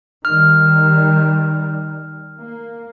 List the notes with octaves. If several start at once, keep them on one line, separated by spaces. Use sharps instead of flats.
D#3 G3 F6
A#3